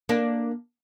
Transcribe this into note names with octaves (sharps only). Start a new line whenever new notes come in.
A#3 D4